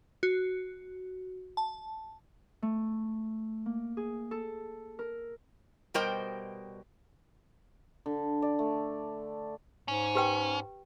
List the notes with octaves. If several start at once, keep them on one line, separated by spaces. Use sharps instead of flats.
F#4
A5
A3
A#3
G#4
A4
A#4
B2 G3 A#4 C5 D#5 G5
D3
D5
A3
G#2 C#4
G4 B4 G5